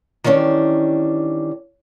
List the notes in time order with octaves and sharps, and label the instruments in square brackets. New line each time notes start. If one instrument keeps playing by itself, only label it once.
[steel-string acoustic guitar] D#3 E3 G3 C#4 D4